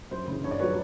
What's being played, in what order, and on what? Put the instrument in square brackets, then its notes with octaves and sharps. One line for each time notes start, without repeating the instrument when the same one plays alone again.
[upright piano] F#2 C5
C#3 E3
G2 C#5
D5
D#3 F#3 B4 C#5